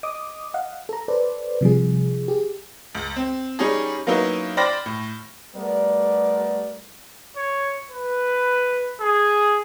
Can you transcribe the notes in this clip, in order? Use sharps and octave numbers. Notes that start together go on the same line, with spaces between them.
D#5 D6 D#6
D#5 F5 F#5
A4 A#5
A4 B4 C5 D5
C3 F3 G3 G#4
G4 G#4
C#2
C4
G3 C#4 D#4 G#4
F#3 A#3 B3 C#4 D#4 E4
C5 D5 G5 B5 F6 A#6
A2
G3 A3 B3 A#4 D5
C#5
B4
G#4